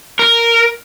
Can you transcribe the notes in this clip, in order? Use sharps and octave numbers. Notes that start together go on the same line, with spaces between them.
A#4